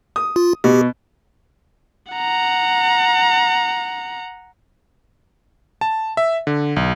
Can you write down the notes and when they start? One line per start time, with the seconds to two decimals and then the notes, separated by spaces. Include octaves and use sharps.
0.16 D#6
0.36 F4
0.64 B2 G4
2.12 F#5 A#5
5.81 A5
6.17 E5
6.47 D3
6.76 B1